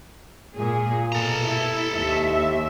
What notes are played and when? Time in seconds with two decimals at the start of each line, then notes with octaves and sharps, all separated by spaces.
0.54 A#2 G#4
1.12 B2 A4 A#5
1.45 E4
1.97 D#2 E5